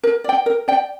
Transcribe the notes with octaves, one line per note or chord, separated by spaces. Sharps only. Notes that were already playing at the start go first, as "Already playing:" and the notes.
A#4
D5 G5
A#4
D5 G5